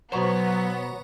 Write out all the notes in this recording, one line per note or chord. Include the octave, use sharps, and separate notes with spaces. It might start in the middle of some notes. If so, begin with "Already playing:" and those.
B2 F#3 B3 C5 C#5 A#5 C#6